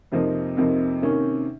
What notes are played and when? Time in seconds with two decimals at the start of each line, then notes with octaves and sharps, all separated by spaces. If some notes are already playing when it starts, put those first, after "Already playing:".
0.12 F2 C3 F3 A#3 D#4
0.57 F2 C3 F3 A#3 D#4
1.02 C3 D#3 A#3 C#4